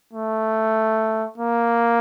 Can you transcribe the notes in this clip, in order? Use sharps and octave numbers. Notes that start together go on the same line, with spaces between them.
A3
A#3